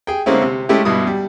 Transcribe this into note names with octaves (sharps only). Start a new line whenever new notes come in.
G#4 G5
D3 G#3 A#3 C4 C#4 E4
C3
G#3 A3 C#4 E4 G4
G2 B2 E4 D#6
G3